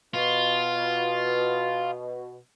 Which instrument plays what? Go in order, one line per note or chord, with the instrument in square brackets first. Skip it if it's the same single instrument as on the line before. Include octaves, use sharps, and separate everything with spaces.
[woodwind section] B2 [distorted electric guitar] F4